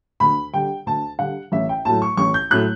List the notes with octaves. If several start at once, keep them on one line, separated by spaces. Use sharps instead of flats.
D2 B5
D3 G3 G5
D2 A5
D3 G3 F#5
A1 E5
G5
A2 F#3 A3 A5
C#6
A1 C#6
G6
A2 F#3 A3 F#6